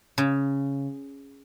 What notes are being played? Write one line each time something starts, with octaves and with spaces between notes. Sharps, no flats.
C#3